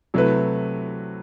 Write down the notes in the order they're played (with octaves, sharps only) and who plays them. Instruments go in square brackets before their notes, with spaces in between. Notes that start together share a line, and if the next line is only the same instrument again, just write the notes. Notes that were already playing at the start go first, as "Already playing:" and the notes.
[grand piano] C3 F#3 A3 E4 B4